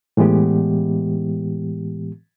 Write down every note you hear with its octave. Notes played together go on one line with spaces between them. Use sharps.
A2 E3 G#3 B3 G4